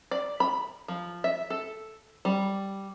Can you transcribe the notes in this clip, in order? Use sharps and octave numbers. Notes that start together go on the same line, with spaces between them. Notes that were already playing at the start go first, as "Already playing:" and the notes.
D5
B5
F3
E5
A4
G3